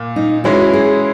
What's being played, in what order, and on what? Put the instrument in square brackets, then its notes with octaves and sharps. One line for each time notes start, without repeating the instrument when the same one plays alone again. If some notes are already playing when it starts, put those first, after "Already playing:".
Already playing: [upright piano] A#2
[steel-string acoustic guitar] D#4
[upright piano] E3 G#3 C#4 E4 [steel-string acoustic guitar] F#4
[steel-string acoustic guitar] G#4